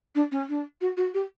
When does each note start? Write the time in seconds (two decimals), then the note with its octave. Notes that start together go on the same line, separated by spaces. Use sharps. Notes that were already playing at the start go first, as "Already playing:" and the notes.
0.15 D4
0.31 C#4
0.49 D4
0.81 F#4
0.97 F#4
1.14 G4